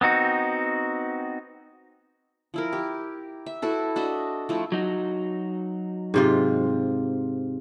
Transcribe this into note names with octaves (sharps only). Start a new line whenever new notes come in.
B3 C4 D#4 F#4
F3 E4 A#4
G4
E5
E4 F#4 A4 B4
D4 F#4 D#5 E5
F3 A3 E4
F#3 D#4 F#4
G#2 C3 F4